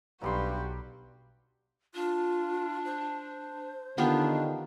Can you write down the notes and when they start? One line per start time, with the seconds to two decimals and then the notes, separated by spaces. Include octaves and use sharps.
0.22 B1 G2 F#3 G3 F#4 G4 C6
1.95 D4 F4
2.85 C5
3.98 D3 D#3 B3 D4 F4 G4